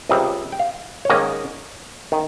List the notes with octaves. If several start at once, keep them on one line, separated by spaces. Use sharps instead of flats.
C#2 C3 G3 C4 D#5
G5
F5
C#5
G#2 D#3 A#3 C#4 D#5
D#3